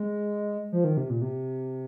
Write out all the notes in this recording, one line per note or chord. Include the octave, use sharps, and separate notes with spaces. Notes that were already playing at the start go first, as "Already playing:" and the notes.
Already playing: G#3
F3
D#3
C3
A#2
C3